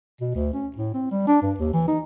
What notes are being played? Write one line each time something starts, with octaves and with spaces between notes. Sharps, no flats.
B2
D2
C#4
A2
C4
G3
D4
G2
D#2
E3
D#4